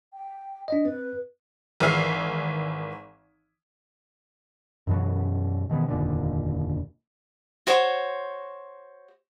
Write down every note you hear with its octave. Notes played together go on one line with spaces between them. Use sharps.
G5
D4 D#5
C4 B4
G#1 E3 G#4 E5 F6 C7
F#2 B2 E3 F#3
B2 D#3 E3 B3
F1 D#2 A#2 D3
F#4 C5 C#5